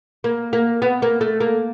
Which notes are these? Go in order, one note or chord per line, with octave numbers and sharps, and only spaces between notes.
A#3
A#3
B3
A#3
A3
A#3